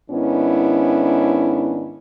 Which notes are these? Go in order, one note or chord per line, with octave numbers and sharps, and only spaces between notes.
G#2 D#3 B3 C#4 D4 E4